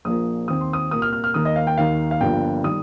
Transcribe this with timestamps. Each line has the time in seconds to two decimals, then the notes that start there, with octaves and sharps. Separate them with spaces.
0.05 A#1 A#2 F3 A#3 D#6
0.48 D#2 D#3 C4 D#6
0.61 C6
0.73 D#6
0.91 C2 A#2 A#3 D#6
1.02 F6
1.13 F6
1.24 F6
1.34 D#2 D#3 A#3 D#6
1.45 D#5
1.56 F5
1.67 G5
1.78 D#2 D#3 A#3 F5
2.11 F5
2.21 G1 G2 F3 A#3 G5
2.64 D#3 G3 D#6